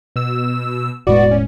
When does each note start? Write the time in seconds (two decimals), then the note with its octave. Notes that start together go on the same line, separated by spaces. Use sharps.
0.16 B2 E6
1.07 E1 A2 G#3 B3 F#4 D5
1.31 C#4